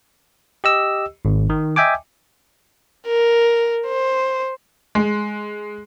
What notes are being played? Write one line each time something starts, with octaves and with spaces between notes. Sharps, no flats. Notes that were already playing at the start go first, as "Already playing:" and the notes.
G4 D#5 E6
G#1
D#3
D#5 E5 G5 G#5 D6
A#4
C5
G#3